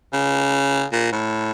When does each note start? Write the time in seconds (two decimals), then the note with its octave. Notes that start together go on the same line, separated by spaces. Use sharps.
0.13 C#3
0.92 A#2
1.12 A2